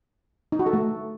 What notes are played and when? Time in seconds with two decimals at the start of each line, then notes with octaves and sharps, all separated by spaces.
0.52 D#4
0.59 F#4
0.66 A4
0.73 A3